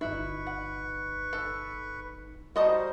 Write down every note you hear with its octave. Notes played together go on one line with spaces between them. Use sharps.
G1 D#4 E4 B4 C#6
F#5
A4
G3 D#4 F#4 C5 D#5 A5